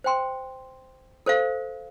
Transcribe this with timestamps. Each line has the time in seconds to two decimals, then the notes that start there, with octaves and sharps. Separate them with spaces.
0.04 C5 G5 C6
1.26 A4 C5 F5